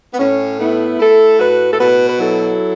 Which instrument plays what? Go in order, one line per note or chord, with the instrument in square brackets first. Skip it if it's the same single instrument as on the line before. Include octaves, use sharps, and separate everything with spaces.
[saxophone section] B3
A2 C#4
A3 B3 E4
A3 E4 A4
A2 F#4 B4
A4
B2 F#4 B4
B4
F#3 E4 A4